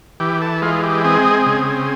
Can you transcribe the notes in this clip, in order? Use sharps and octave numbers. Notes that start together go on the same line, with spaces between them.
E3 G4
A4
G#3 F4
G4
C4 G#4
C#3